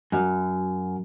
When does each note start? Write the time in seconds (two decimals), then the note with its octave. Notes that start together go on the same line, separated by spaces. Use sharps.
0.12 F#2